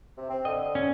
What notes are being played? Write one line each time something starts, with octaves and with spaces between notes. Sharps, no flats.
C3
C4
D3 D#5
C#4